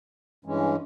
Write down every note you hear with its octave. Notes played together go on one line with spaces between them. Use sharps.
G2 E3 G#3 C#4